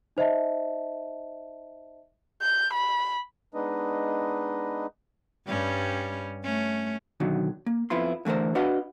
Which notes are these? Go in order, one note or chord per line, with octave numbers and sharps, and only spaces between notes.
D#4 C5 D#5 E5 A5
G6
B5
G#3 B3 D4 D#4 B4 D#5
G2 G3 C#4
A3 C#4
B2 D3 D#3 F#3
A#3
F2 B3 E4 F4 C6
D3 E3 A3 A#4 C5
D4 F#4 B4 D#5 F5 F#5